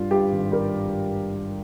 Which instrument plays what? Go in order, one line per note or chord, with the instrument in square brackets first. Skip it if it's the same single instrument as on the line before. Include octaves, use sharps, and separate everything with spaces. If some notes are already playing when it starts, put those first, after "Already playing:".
Already playing: [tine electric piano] G2 G3 [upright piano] F4
[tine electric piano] G2 [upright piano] G4
[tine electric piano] G#1
[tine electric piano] G3 [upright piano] A#4